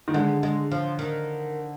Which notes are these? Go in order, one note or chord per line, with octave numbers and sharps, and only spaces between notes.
D#3
D3 G#3
G#3
F3
D#3